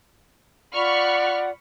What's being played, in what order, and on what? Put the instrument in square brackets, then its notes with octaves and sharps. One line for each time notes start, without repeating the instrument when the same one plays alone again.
[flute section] F4 D5 F#5 [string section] B5 C#6 F6